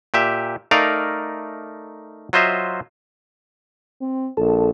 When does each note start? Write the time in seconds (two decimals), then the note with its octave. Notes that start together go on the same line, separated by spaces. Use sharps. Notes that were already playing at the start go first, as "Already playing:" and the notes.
0.14 A#2 G4 E5
0.71 A3 D#4 A#4 D5 F5
2.33 F#3 F4 C5 D#5 E5
4.01 C4
4.37 A#1 A4